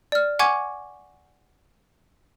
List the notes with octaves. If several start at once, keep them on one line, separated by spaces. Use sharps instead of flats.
D5 F6
F#5 G#5 C#6 D6 G#6